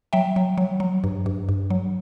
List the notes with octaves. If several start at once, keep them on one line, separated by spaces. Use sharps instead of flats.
F#3 E5 G5
F#3
F#3
F#3
G2
G2
G2
F#3